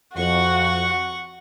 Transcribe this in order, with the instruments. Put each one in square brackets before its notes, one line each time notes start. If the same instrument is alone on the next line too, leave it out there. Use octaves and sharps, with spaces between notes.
[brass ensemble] F2 [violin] F#4 [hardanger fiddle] F#5 C#6